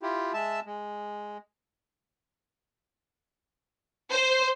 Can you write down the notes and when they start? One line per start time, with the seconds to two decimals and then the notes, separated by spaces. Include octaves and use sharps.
0.03 E4 F4 G4
0.34 G#3 E5 A5 E6
0.66 G#3
4.11 C5